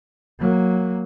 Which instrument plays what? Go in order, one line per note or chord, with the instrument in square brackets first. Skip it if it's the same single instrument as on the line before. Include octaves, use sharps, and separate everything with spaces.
[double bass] F#3 A#3